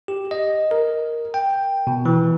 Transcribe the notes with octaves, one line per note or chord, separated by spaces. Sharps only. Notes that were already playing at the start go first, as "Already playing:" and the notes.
G4
D#5
A#4
G5
B2
E3